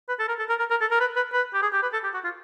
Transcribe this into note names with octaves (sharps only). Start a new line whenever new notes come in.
B4
A4
A#4
A4
A#4
A#4
A#4
A4
A#4
B4
B4
B4
G4
G#4
G4
B4
A4
G4
F#4
F4